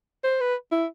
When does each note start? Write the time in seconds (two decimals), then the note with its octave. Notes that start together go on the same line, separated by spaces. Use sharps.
0.24 C5
0.40 B4
0.71 E4